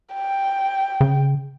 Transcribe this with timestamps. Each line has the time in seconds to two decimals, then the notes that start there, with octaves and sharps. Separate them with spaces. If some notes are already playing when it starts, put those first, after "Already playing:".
0.14 G5
1.01 C#3